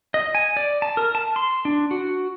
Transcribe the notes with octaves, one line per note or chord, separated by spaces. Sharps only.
D#5
G#5
D5
A5
A#4
A5
C6
D4
F#4